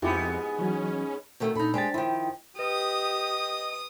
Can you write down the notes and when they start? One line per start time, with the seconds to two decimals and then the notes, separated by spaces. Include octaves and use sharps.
0.02 F2 G#2 B3 E4 F4 G4
0.59 E3 F#3 C#4
1.40 B2 D#3 A3
1.55 A#2 D4 D#4 A4 B5
1.74 G#3 D4 G4 C5 A6
1.94 D#3 F3 E4 F4 G5
2.59 G4 B4 D#5 D#6